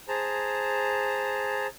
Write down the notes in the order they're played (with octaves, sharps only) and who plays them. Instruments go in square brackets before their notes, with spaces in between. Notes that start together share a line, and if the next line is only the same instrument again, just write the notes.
[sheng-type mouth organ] G#4 C5 A5 A#5